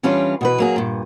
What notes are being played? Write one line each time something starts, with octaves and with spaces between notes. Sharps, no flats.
E3 G3 C#4 D4 F4 C#5
B2 E3 B4
F#3 A#3 G#4
G2 A#2